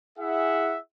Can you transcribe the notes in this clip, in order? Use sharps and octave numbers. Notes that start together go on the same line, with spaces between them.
E4 G#4 E5 F#5